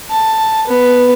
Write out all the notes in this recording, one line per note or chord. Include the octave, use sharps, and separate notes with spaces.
A5
B3